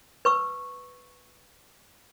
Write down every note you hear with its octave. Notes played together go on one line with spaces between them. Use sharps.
B4 C#6 E6